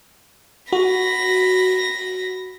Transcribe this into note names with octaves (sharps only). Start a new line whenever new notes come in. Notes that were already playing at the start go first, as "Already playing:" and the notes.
F#4 B5 A#6